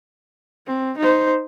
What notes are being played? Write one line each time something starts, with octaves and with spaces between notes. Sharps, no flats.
C4
D#4 C5